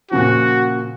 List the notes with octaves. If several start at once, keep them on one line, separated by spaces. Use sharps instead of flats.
A#2 C#3 F3 F#4